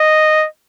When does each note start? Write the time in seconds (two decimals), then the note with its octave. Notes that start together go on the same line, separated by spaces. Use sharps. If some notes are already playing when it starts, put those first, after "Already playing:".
Already playing: D#5